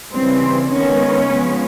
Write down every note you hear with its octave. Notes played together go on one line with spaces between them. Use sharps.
C#3 E3 G3 C4
D#3 G#3 B3 C#4
C#3 F3 G#3 B3